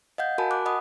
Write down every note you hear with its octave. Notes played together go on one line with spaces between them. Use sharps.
D#5 F5 F#5 G6
F#4 A#4 G#5 A5 B5
D6 F#6
D#5 F#5 B5 D#6